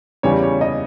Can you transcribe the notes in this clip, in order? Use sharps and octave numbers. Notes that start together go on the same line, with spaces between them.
E2 C#3 G3 C#5
C#5
D#5